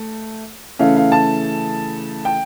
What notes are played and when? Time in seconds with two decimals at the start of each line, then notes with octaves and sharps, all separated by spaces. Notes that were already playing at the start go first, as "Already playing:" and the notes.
Already playing: A3
0.79 C#3 E3 A3 C#4 F5
0.97 F5
1.12 A5
2.25 G5